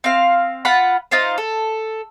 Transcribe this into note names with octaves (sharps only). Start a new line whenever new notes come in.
C4 F5
F4 F#5 B5
D#4 F4 C5
A4